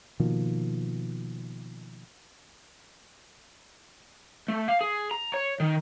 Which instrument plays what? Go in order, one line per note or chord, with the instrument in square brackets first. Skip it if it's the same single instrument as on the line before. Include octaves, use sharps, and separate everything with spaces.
[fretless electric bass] B2 D#3 F3 A#3
[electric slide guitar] A3
F5
G#4
A#5
C#5
D#3